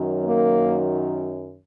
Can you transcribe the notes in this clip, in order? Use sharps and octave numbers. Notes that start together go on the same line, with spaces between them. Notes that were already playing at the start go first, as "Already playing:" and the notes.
Already playing: F#2 D#3 F#3
A#3